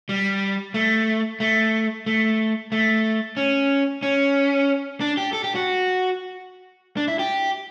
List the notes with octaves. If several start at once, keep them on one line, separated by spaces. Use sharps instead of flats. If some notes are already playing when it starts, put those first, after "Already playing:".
G3
A3
A3
A3
A3
C#4
C#4
D4
G4
A4
G4
F#4
D4
E4
G4